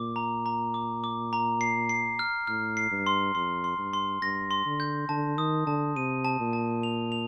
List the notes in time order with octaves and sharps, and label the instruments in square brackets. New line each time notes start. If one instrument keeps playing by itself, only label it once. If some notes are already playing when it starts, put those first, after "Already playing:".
Already playing: [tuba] A#2 [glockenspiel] D6
[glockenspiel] A#5
A#5
D6
D6
A#5
C7
C7
F6
[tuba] A2 [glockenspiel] F6
[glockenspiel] C7
[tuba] G2
[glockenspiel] C6
[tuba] F2 [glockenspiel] C6
[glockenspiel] C6
[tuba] G2
[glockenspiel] C6
[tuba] G2 [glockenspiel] A#6
[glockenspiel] C6
[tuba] D3
[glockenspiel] G6
[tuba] D3 [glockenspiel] A5
[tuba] D#3 [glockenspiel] D#6
[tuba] D3 [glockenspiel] A5
[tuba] C3 [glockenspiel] D#7
[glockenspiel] A5
[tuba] A#2
[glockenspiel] A5
F7
F7